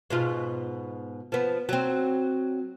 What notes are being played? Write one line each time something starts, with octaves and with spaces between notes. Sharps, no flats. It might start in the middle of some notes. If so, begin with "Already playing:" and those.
G#2 B2 F4
F3 B3
F#3 C4